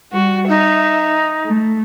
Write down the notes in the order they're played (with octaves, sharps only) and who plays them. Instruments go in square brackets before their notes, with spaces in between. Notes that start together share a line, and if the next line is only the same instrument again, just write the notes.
[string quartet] G3 F#4
[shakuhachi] D#4 [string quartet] E5
[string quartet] A3